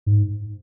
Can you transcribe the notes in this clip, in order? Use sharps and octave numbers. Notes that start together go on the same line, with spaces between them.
G#2